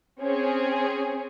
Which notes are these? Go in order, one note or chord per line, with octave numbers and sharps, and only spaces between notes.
C4 C#4 G#4